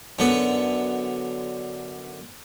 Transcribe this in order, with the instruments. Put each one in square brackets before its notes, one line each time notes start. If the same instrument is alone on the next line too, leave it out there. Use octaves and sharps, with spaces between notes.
[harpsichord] F#2 D3 B3